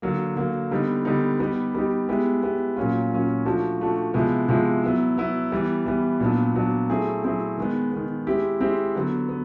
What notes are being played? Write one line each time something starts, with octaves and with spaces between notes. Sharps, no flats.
D3 F#3 A#3
D3 F#3 A#3
D3 G3 B3 D#4
D3 G3 B3 D#4
G3 B3 D#4 G4
G3 B3 D#4 G4
G#3 B3 E4 G4
G#3 B3 E4 G4
A#2 F#3 A#3 C#4 F4
A#2 F#3 A#3 C#4 F4
F3 A3 D4 F#4
F3 A3 D4 F#4
C3 F3 G#3 B3 E4
C3 F3 G#3 B3 E4
F#3 B3 E4
F#3 B3 E4
E3 G3 B3
E3 G3 B3
A#2 F#3 B3 D4
A#2 F#3 B3 D4
F#3 A3 C4 E4 G#4
F#3 A3 C4 E4 G#4
D#3 G#3 B3
D#3 G#3 B3
G#3 C4 E4 G4
G#3 C4 E4 G4
D3 F#3 B3
B3